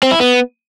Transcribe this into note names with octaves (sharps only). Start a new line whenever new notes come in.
C4
E4
B3